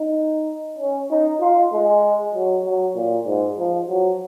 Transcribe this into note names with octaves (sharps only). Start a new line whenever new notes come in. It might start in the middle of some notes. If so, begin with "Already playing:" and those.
Already playing: D#4
C#4
D#4
F4
G#3
F#3
F#3
A#2
G#2
F3
F#3